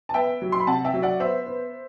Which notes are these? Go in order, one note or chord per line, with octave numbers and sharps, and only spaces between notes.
A5
B3 E5 G5
F#3
C6
B5
C3 F#5 A5
E5 G5
F#3
D5 F#5
B3 C5 E5
B3